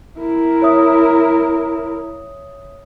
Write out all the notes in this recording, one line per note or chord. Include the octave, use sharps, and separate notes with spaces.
E4 A#4
C#5 E5 D#6